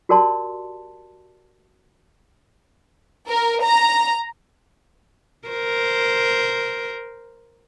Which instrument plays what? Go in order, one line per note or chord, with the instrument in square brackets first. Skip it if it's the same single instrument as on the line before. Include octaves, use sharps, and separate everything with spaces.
[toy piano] F#4 G4 A#4 D5 A5 C6
[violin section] A#4
A#5
[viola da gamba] A#4 C5